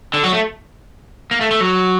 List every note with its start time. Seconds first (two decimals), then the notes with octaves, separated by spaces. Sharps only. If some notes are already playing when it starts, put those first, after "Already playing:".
0.13 D3
0.23 F#3
0.33 A3
1.31 A#3
1.41 A3
1.51 A3
1.61 F#3